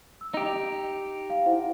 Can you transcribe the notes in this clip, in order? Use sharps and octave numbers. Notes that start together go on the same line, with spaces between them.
E6
D#4 G4
F7
F5
E4 C5 F#5